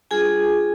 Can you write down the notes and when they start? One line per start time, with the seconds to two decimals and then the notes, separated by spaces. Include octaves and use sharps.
0.11 G3 D4 F4 G#4 G#5